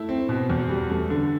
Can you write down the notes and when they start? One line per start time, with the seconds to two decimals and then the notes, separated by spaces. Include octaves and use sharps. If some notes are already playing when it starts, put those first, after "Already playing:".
Already playing: A3 E4
0.09 C4
0.29 B2
0.50 E2
0.69 G3
0.90 A3
1.10 D3